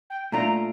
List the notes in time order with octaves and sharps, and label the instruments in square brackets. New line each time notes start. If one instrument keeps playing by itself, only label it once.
[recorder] G5
[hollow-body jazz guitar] A#2 A3 D4 F4 [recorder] A#5